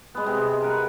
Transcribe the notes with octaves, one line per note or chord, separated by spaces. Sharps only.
G#3 B3
C3
A#4 B4 F#5